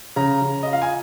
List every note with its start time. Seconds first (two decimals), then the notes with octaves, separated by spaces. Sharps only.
0.16 C#3 A#5
0.42 C#3
0.63 F4 D#5
0.73 F5
0.82 G#5